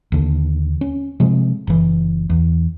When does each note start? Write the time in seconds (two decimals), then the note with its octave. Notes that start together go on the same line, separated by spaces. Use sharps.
0.12 D#2 D3
0.81 C#4
1.20 C3 F3 G#3
1.67 F#1 E3
2.30 E2